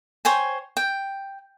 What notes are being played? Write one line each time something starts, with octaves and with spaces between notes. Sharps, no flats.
C5 C#5 G5 G#5
G5